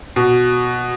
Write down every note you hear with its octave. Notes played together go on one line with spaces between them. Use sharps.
B2